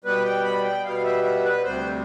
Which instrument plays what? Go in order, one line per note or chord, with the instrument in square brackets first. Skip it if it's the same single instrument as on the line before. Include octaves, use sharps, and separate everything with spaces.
[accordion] B2 G3 B3 B4
G5
B5
G5
B2 G3 B3 F5
E5
E5
B4
D2 C3 G3 C5